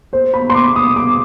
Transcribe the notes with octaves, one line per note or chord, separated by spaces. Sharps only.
C5
B5
C6
D6
D#6
D6